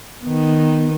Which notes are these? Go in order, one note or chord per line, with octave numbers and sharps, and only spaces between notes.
D#3 B3